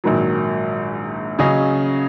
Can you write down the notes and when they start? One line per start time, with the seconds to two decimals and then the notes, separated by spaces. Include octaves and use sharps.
0.04 A#1 G#2 D#3 F#3
1.39 C#3 F#3 C#4 G#4 D#5